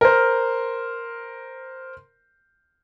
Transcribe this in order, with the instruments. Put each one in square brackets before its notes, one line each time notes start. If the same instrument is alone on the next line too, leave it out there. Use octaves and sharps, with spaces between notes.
[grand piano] A#4 C5